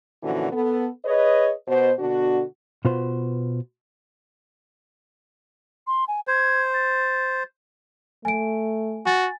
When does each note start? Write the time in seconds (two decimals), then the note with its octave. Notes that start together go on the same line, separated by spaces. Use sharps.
0.23 A#2 D3 E3 F3 C#4 F#4
0.53 B3 A4
1.05 G#4 B4 C#5 D#5
1.68 B2 C5
1.99 B2 D3 D4 F#4
2.85 B2 F4 B4 C5
5.87 C6
6.08 G#5
6.27 C5 G#6
6.74 A6
8.25 A3 G#5 D7
9.06 F#4 G#5 A6